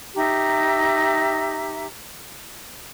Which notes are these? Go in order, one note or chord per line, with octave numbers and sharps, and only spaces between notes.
D#4 G4 E5 A#5